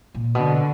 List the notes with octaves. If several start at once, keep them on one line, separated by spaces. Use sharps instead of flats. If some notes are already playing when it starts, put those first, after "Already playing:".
A#2
B2 D3